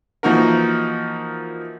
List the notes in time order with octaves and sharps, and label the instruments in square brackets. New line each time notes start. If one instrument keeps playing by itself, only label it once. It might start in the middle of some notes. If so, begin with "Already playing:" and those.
[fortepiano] E3 F3 A#3 D#4 F#4 A#4